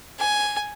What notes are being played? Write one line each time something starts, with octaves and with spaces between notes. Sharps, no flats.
G#5